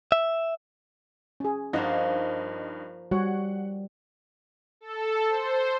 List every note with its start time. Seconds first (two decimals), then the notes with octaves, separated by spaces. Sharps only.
0.12 E5
1.40 C#4 G#4
1.73 G2 F3 A#3 D#4 C5 F#5
3.11 G3 F#4 C#5 F#5
4.81 A4
5.28 C5